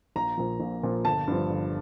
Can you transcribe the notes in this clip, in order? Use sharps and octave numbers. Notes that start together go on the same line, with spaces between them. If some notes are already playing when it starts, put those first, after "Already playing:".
A#1 A#5
A#2 F3
A#1
A#2 F3
G1 A5
G2 D3 F3
G1